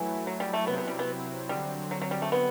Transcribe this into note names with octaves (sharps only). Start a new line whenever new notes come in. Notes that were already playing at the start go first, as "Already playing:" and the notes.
Already playing: E3 F#3 A3 E4
F#3
G3
A3
C3 F#3 B3 C4 E4
B3
G3
B3
D3 F#3 G3 C4
F#3
F#3
G3
A3
B3